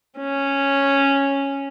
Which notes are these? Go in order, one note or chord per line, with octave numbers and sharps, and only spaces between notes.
C#4